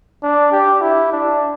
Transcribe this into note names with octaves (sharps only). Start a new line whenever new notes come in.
D4
G4
E4
D4